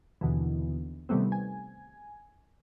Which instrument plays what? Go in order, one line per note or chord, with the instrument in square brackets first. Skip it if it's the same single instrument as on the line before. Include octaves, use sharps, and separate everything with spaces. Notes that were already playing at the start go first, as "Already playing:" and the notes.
[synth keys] D#2 B2 D3 E3
C3 D#3 G3 A3 B3 C4
G#5